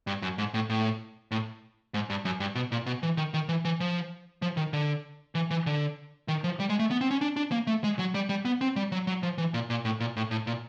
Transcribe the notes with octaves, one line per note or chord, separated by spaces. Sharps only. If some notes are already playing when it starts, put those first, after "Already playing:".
G2
F#2
G#2
A2
A2
A2
G#2
G2
F#2
G2
B2
A#2
B2
E3
D#3
D#3
E3
E3
F3
F3
D#3
D3
E3
E3
D3
D#3
F3
G3
G#3
A3
B3
C4
C#4
D4
D4
A#3
A3
G#3
F#3
G3
G3
B3
C4
G3
F#3
F#3
F3
E3
A#2
A#2
A2
A#2
A2
A2
A#2